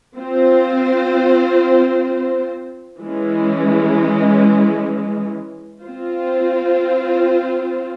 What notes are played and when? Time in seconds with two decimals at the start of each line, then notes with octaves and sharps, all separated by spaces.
0.18 C4 F4 C5
3.01 E3 G#3 C#4
5.84 C4 F4 C5